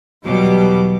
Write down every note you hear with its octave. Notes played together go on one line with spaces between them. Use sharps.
E2 B2 F#3 G3 D6